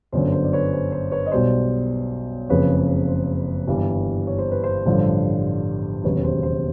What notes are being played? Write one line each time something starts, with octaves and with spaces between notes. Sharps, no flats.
G1 F#2 D3 C5
C5
D5
B4 C#5
C5
C5
B4 C#5
D#5
B1 B2 G3 C5 D5
F#1 F2 C#3 F3 B4 C#5
C5
G1 G2 E3 G3
C#5
C5
B4
C5
A1 G2 D3 F3
E1 D#2 C#3 F#3 B4
C5
C5